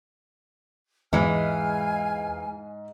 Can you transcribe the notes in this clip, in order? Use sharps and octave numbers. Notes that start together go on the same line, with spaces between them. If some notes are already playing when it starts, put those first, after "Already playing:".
E2 G#2 E3 G#3 F5 G#5 F6